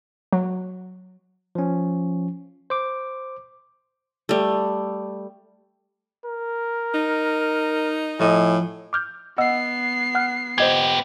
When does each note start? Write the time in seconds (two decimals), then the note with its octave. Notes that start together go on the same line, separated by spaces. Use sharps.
0.33 F#3
1.55 F3 C#4
2.70 C5 D6
4.29 G3 A3
6.26 A#4
6.94 D#4
8.20 A2 F3 D#5 G#5
8.93 D6 F6 G6
9.38 B3 D#5 F#5 E6 C7
10.15 F#5 F6 F#6
10.58 B3 G4 C5 D#5 G#6